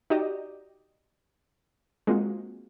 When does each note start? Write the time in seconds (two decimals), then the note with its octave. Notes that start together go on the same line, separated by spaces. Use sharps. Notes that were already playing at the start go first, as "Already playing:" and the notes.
0.10 D#4 F#4 G4 D5 D#5
2.07 G#3 A#3 C4 F4 F#4